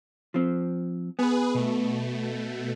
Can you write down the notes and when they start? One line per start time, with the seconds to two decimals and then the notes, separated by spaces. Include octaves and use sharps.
0.34 F3 C4
1.19 B3 G#4 B4
1.54 B2 A3